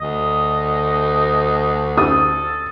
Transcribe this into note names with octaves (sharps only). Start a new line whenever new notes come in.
D2 D#5
A4 D#6